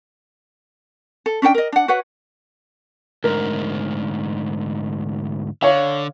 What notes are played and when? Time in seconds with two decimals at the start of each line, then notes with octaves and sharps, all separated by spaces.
1.26 A4
1.42 C#4 D4 A4 G5
1.54 A#4 D#5
1.72 D4 F#5
1.88 F#4 B4 C#5 F#5
3.24 D2 G#2 A#4
5.62 D3 C#5 F5